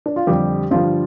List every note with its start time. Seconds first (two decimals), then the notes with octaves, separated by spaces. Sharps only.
0.06 D4
0.16 F4
0.27 F2 D3 G3 G4
0.71 G2 D3 F3 G3 F4